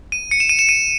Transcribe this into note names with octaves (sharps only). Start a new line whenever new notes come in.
D#7
C#7
E7
D#7
E7
D#7